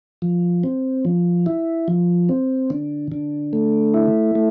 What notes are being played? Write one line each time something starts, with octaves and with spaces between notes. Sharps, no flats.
F3
C4
F3
E4
F3
C4
D3
D3
A3
E4
A3